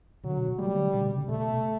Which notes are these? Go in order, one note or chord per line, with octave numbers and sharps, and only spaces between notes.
B2 D3 F#3
F#3 G3 A3
D3 F#3
B2 D3
C#3
B2 A3